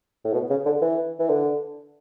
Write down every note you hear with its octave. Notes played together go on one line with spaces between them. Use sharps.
A2
B2
C#3
D3
E3
E3
D3